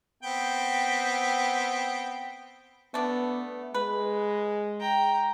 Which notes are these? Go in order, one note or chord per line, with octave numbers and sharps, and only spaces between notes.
B3 C4 G5
A3 B3 D4
G#3 B4
G5 A#5